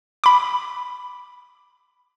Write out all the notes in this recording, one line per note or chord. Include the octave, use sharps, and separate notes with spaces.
B5 D6